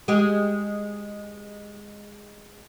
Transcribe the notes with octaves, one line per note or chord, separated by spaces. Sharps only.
G#3 G4